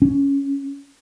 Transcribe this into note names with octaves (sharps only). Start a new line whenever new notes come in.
C#4